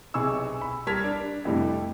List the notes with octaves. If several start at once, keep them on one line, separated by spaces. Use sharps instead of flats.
B1 C3 G#4 C#6 E6
B5
G3 A#4 A5 G#6 B6 F7
D4
F2 A2 C3 G3 A3